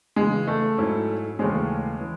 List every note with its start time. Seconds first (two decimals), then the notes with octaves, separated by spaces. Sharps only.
0.16 C#2 C#3 E3 G#3
0.47 A3
0.77 G#2 F#3 C#4 E4
1.39 D#2 C#3 E3 G#3 A3 C#4
2.01 E3